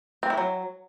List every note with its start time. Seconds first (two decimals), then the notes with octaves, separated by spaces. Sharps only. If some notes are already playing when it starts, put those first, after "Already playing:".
0.23 C4
0.30 E4
0.37 F#3